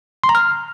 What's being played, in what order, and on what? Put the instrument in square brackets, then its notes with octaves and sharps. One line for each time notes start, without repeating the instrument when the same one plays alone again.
[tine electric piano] C6
A#5
F6